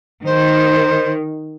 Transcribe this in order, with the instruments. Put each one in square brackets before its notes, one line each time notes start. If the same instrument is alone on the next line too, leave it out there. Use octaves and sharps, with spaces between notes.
[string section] D#3 [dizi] C5